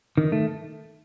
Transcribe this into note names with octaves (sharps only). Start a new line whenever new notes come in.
D#3
A3